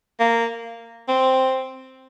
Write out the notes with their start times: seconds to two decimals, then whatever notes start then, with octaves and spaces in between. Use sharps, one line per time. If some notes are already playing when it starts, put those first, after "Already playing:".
0.20 A#3
1.08 C4